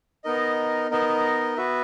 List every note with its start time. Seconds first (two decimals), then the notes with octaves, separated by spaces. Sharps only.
0.24 B3 D#4 A#4 D#5
0.91 B3 D#4 A#4 D#5
1.57 B3 F#4 B4 E5